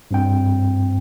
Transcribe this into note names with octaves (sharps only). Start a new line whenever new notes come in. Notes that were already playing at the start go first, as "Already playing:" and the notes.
G2 C4 G5